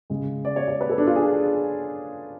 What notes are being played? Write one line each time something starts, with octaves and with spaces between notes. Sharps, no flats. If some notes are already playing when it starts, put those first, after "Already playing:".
C#3 G#3
D5
C#5
C#5
B4
A4
D4
F4
G#4